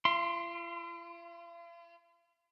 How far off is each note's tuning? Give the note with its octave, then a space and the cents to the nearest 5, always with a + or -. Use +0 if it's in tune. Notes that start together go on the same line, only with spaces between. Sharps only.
F4 -45 C6 +0